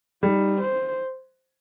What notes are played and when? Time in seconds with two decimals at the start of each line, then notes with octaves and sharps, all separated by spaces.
0.23 G3 D#4
0.61 C5